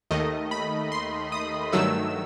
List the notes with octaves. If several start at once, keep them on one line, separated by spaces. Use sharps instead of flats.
D#2 D#3 A3 D#5
B5
C6
D#6
G2 D#3 F#3 A3 E6